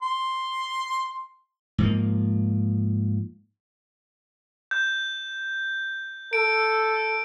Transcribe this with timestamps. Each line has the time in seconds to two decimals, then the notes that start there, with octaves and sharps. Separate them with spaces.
0.03 C6
1.78 G#2 F3 A#3
4.71 G6
6.33 A4 D7